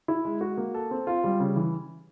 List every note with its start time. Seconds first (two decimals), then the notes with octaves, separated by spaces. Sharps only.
0.08 E4
0.25 G#3
0.41 F#4
0.57 A#3
0.75 A4
0.91 C4
1.07 F4
1.24 G3
1.40 C#3
1.56 E3